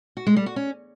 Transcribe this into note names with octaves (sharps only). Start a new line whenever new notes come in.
F#4
G#3
G3
F#4
C#4